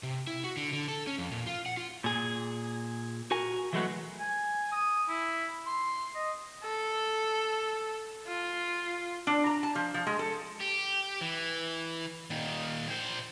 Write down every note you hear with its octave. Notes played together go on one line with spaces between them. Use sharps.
C3
E4
F#4
D3
D3
A4
C#4
F2
A#2
F4
F#5
F4
A#2 G#4
F#4 A#4 G#5
E3 F#3 G#3 A3 B3 F#4
G#5
D#6
E4
C6
D#5
A4
F4
D4
A#5
A5
F3
F3
G#3
A4
G4
E3
A#2 D#3
A#2 C5